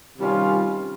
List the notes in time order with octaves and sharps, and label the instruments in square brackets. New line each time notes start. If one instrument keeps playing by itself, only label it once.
[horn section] C3 D#3 G3 C#4 F4